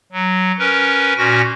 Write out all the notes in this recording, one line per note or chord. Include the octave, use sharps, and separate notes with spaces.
F#3
C#4 A#4 B4
A#2 C#4 F#4 A#6